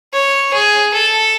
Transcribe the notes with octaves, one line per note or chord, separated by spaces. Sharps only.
C#5
G#4
A4